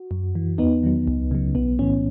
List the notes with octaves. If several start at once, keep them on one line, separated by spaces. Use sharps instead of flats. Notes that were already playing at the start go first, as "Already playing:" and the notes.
Already playing: F#4
F#2
E3
E2 B3 D#4
D#3 F#3
C#2
C#3 F#3
B1 B3
A2 E3 C#4